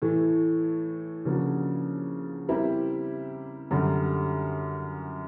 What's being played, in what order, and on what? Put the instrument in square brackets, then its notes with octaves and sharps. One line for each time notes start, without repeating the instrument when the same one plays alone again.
[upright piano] A2 E3 A3
C#3 F3 A#3 D4 F#4
G3 C4 E4 G4 A#4
F#2 D3 G3